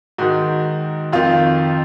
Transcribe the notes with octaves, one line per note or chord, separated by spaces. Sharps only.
G#2 D#3 F#4
F2 D#3 F4